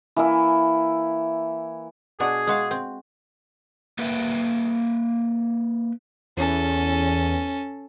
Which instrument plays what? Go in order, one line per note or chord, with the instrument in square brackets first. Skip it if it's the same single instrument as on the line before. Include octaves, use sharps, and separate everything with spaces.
[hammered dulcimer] E3 A#3 E4
[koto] B2 D4 F#4 [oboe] G#4
[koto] G#3 F#4 F5
C4
[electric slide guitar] A#3 B4 E5 G5
[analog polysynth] E2 [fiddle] C#4 A4